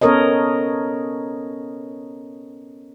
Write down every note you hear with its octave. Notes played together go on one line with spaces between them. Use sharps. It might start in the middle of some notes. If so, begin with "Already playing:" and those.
B3 C#4 A4 A#4 C#5 D#5